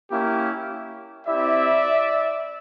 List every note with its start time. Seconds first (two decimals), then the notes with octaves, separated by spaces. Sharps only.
0.11 A#3 C#4 E4 G4
1.27 C4 E4 G4 D5 E5